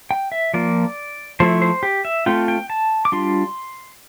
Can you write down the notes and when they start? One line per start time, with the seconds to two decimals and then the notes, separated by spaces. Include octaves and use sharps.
0.11 G5
0.32 E5
0.54 F3 A#3 F4 D5
1.40 F3 A3 E4 C5
1.62 C5
1.83 G4
2.05 E5
2.26 A3 C4 F4 G5
2.48 G5
2.70 A5
3.05 D6
3.12 G3 D4 F4 C6